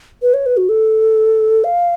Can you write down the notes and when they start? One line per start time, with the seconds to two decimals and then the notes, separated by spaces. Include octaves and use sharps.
0.22 B4
0.34 C#5
0.46 B4
0.57 F#4
0.69 A4
1.64 F5